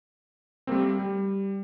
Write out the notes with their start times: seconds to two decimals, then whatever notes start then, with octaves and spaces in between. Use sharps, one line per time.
0.67 G3 A3 A#3 C4
0.99 G3